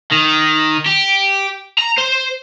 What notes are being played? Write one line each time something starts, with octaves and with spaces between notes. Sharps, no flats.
D#3
G4
A#5
C5